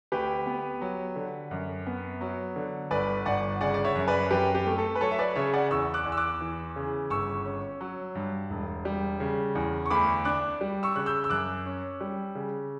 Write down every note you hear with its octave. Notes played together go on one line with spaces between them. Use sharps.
D2 G4 B4
B3
F#3
D3
F#2
B3
F#3
D3
G1 B4 D5
G1 D5 F#5
C#3 D5 F#5
D5
C#5 E5
F#2
B4 D5
F#2 G4 B4
G4
A3
A4
B4
F#3 A4 C#5
E5
B4 D5
C#3 C#5 E5
D5 F#5
E2 C#6 E6
D6 F#6
E2
E6
D6 F#6
E3
C#3
G1 C#6 E6
C#4
F#3
G2
E1
G3
C#3
E2
C#6
D2 B5 D6
D4 D6 F#6
G3
C#6 E6
C#3 F#6
E6 G6
E6
F#2 D6 F#6
C#4
G3
C#3